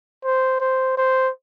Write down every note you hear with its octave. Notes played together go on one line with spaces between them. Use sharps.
C5
C5
C5